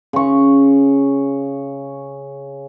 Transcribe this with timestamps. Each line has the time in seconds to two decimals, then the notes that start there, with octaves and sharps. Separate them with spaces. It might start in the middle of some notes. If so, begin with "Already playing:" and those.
0.13 C#3 C#6